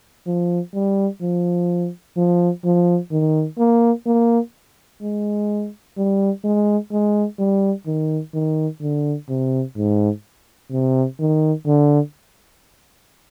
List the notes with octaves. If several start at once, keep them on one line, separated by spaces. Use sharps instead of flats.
F3
G3
F3
F3
F3
D#3
A#3
A#3
G#3
G3
G#3
G#3
G3
D#3
D#3
D3
C3
G#2
C3
D#3
D3